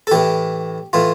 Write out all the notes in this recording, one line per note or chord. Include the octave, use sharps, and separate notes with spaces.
A4
A2 E3 G4
A2 E3 F4